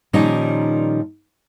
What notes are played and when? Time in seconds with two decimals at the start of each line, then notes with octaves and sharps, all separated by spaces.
0.13 A#2 D#3 F3 G3 C#4 D#4